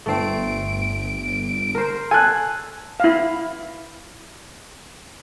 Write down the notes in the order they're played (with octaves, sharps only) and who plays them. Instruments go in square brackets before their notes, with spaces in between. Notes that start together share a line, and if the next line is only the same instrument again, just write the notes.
[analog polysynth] G1 D7 [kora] A3 C4
[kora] A#4 C5
[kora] A4 [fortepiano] G#5 F#6
[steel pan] E4 F5